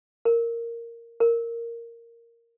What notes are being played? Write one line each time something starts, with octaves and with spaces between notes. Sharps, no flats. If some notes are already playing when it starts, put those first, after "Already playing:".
A#4
A#4